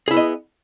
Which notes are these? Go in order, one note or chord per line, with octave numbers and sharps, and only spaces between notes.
B3 E4 G#4 D#5